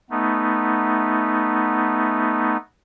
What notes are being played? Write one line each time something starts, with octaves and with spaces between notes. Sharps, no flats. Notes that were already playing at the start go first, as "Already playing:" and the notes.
A3 B3 D#4